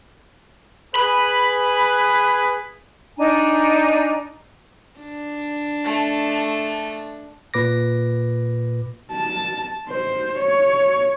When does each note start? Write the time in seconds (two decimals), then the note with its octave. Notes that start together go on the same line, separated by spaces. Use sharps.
0.95 G#4 B4 B5
3.17 D4 D#4 G#5 A#5
4.99 D4
5.84 A3
7.54 A#2 B4 D6 A#6
9.12 A5
9.90 C5
10.39 C#5